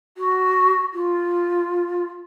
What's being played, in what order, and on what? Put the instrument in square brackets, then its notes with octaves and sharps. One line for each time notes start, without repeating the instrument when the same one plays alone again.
[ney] F#4
F4